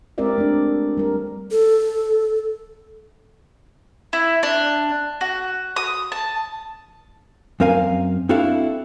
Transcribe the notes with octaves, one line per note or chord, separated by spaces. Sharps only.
G#3 C4 G4 A#4 D5 E5
A3 D4
G3 A#4
A4
E4
D4
F#4
D#6
A5
F#2 C4 A#4 F5 G#5
C4 D4 E4 F#4 A4 F5